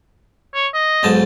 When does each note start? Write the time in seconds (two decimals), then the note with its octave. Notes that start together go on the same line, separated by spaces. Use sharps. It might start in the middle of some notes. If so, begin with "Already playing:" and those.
0.54 C#5
0.74 D#5
1.03 B1 G#2 A5